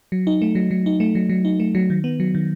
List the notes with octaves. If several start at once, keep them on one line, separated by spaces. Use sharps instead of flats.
F#3
D#4
A3
F#3
F#3
D#4
A3
F#3
F#3
D#4
A3
F#3
D#3
B3
F#3
D#3